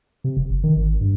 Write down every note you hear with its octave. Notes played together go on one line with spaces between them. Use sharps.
C3
E1
F#1
D#3
G#1
G2